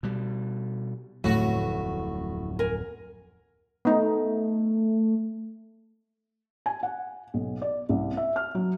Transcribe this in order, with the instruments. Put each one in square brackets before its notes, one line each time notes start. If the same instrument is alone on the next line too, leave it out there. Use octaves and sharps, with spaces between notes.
[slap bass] B2 G3
[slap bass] D1 F2 F#3 [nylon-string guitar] A2 [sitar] F#4
[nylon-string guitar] A#4 G#5
[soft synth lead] A3 [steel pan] B3 D#4
[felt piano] G#5
F#5
B1
D5
C2
E5
F6
F#3